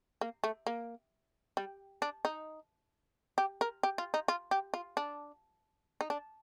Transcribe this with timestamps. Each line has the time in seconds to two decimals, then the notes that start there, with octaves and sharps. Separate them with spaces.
0.21 A#3
0.44 A3
0.67 A#3
1.57 G3
2.02 D4
2.25 D#4
3.38 G4
3.61 A#4
3.83 G4
3.98 F4
4.14 D#4
4.28 F4
4.51 G4
4.74 F4
4.97 D4
6.01 D#4
6.10 D4